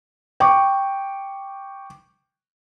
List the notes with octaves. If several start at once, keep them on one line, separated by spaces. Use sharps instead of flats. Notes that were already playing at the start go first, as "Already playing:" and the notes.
G5 C#6 D6